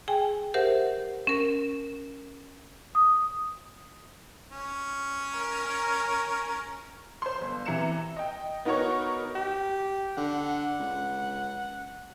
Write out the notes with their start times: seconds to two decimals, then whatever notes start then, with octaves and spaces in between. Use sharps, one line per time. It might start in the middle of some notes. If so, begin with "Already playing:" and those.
0.08 G#4 G5 G#5
0.54 G4 A#4 C5 E5 F#5
1.27 C#4 A#4
2.95 D#6
4.51 C#4
5.37 A#4
7.22 C5 C6
7.41 G1
7.66 C3 E3 A#5 C#7 E7
8.17 D#5 G5
8.65 B3 D#4 F#4 A#4 C#5 C#6
9.36 G4
10.17 D3 F#5
10.79 C#2